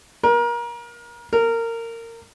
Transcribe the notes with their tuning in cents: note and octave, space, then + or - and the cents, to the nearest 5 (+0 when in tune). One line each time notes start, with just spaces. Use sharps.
A#4 +30
A#4 -20